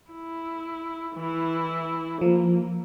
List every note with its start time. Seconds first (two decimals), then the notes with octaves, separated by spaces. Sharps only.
0.11 E4
1.15 E3 E4
2.21 F3 A#3